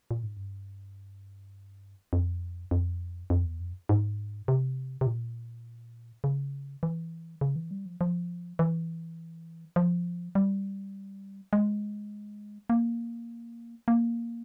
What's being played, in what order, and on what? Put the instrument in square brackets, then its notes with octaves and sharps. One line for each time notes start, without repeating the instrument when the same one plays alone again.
[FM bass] A#2
G#2
G2
F2
F2
F2
E2
F2
G#2
C3
C3
A#2
C#3
E3
C#3
E3
G3
F3
F3
E3
F3
G3
G#3
A#3
A#3